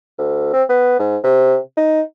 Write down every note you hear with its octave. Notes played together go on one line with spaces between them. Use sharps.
D2
C4
B3
G#2
C3
D#4